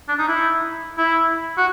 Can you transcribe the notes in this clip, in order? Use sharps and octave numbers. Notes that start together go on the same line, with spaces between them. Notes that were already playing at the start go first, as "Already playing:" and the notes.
D4
D#4
E4
E4
F#4